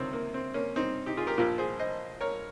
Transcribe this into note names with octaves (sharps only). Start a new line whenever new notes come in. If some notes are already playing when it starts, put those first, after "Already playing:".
Already playing: C#2 C3 D#3 C4
A#3
C4
A#3 C#4
C4 D#4
D#4 G4
F4 G#4
G4 A#4
A#1 A#2 F3 G4 A#4
G#4 C5
C5 D#5
A#4 C#5